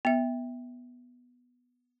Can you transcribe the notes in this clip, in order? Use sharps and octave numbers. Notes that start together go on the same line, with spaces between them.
B3 E5